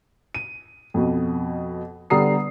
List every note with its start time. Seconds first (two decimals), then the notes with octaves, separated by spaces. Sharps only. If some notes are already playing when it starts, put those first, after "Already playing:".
0.34 D#7
0.94 F2 B2
2.10 D3 G3 B3 A#5 D#6 C7